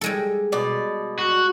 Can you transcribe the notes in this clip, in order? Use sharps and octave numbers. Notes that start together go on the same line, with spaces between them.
G3 G#3 A4
B2 D5
F#4